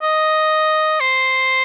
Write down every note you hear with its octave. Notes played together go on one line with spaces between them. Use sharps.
D#5
C5